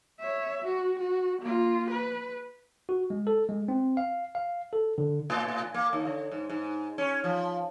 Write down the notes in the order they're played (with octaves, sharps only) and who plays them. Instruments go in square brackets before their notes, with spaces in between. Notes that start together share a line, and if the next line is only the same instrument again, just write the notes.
[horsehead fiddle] C#5 E5
F#4
F#4
A#3 F4
B4
[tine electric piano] F#4
G#3
A4
G#3
C4
F5
F5
A4
D3
[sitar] A2
A#3
D#2
D3
G#2
G#2
C#4
F3